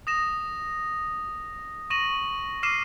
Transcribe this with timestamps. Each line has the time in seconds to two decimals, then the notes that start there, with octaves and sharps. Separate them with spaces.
0.07 D#6 A#6 E7
1.90 C#6 A#6 D#7 E7 F#7
2.63 D6 F6 C7 D#7 E7